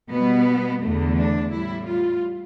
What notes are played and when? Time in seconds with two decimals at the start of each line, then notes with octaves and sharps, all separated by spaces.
0.12 B2 G3 B3
0.82 E2 D3 A3
1.18 D4
1.52 A2 G3 E4
1.88 F4